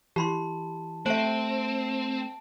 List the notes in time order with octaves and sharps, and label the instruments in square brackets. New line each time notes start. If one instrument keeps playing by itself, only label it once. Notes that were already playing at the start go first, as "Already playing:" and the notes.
[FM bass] E3 [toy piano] G4 B5 C6 [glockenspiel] A5
[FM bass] A3 [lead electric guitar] C4 [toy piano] C5 E5 [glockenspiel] A5 D7 F#7